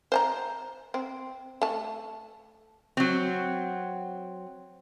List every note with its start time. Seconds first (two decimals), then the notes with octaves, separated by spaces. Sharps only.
0.12 C5 A5 A#5
0.94 C4
1.62 A3 A5
2.97 F#3 C4